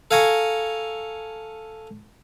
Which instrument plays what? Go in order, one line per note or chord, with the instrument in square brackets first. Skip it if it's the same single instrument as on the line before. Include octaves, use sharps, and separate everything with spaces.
[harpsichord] A4 F5 G#5 A#5 C#6